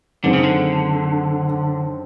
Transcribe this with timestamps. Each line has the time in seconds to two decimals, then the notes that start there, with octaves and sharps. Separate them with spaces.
0.23 F#2 D3 D#3 G#3 C4
0.33 C#3
0.43 D3